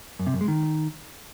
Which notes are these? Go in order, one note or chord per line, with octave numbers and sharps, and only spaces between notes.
F#2
C3
F#2
G#3
D#3